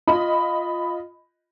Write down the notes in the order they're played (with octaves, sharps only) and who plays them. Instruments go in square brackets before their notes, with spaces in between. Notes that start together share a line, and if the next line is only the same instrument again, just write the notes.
[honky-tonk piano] F4 D#5 B5